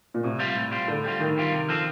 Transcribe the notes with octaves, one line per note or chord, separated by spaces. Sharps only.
A#2
A2 C3
G3 C4 F4
A2
G3 C4 F4
A2 D3
G3 C4 F4
A2 D#3
G3 C4 F4
C3
F3 C4 F4 A4